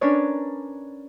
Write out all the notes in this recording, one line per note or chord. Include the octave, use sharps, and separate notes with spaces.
C#4 D4 A#4 B4 C#5 D5